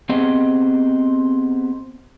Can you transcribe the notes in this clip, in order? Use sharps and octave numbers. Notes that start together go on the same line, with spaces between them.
B3 C4 G4 G#4 D#5